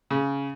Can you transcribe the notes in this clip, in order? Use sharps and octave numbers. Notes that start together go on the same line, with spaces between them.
C#3